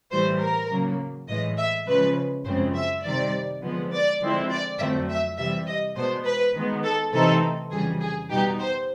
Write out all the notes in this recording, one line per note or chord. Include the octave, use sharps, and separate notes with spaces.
A2 E3 G3 C5
A#4
C#3 F#3 A#3
A2 E3 G#3 D#5
E5
C#3 F3 G#3 B4
F#2 C#3 F3 G#3 C4 C5
E5
C3 D#3 G3 D5
D3 F3 G#3 B3
D5
D3 F3 G#3 C4 E4
D5
F2 D3 F#3 A3 C4 E5
E5
C3 E3 G3 E5
D#5
B2 G#3 B3 D4 C5
B4
D#3 G#3 B3
A4
C3 E3 A3 C4 D#4 A4
F2 C#3 E3 G3 G#4
G#4
B2 G3 B3 D#4 G4
C5